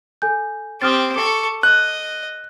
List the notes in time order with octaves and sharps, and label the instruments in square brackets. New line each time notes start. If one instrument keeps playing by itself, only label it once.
[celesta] A4 G#5 G6
[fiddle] C4 G4 [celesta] D#6 F6 A6
[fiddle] A4 C#6 [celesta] D6
[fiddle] D#5 [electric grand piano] F#6